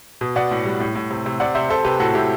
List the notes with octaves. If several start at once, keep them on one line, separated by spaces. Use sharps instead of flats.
B2
B2 D5 F#5
A2
G3
A2
A2
C3
C3
C3 D5 F#5
C3 C5 E5
C3 A4 C5
C3 G4 B4
A2 F#4 A4
A2 E4 G4